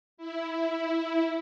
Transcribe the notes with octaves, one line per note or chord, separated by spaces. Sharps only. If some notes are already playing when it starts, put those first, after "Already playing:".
E4
E4